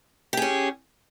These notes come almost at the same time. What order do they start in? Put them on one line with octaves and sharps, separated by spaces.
G4 G#4 C#4